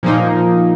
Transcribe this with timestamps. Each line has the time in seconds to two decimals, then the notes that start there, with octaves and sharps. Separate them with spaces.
0.03 A#2 F3 A#3 D#4